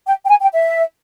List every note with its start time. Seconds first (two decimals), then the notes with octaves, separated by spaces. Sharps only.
0.06 G5
0.25 G5
0.29 G#5
0.41 G5
0.53 E5